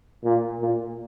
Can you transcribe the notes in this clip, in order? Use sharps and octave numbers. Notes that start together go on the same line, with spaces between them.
A#2
A#2